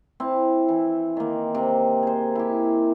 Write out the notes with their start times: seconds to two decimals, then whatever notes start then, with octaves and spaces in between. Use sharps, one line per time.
0.20 C4 E4
0.69 E3
1.17 D#3 A#3
1.55 C3
2.03 G#4 C5
2.35 E4 G4